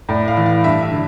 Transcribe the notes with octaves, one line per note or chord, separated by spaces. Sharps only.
A2 D5
F5
E3
F5
G2 E5
E5
D3